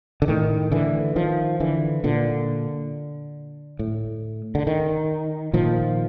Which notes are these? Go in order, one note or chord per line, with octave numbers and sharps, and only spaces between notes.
D3
A2 D#3
D3 E3
D#3 F3
D3 E3
A#2 D3
A2
D3
D#3
A#2 D#3 F3